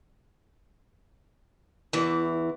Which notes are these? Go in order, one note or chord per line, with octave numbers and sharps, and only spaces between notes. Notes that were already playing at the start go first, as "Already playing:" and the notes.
E2 E3 E4